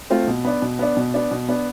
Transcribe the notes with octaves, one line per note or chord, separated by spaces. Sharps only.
A3 C4 F4
B2
B3 D4
B2
B3 D4
B2
B3 D4
B2
B3 D4